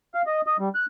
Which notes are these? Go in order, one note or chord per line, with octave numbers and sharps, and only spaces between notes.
F5
D#5
D#5
G3
F#6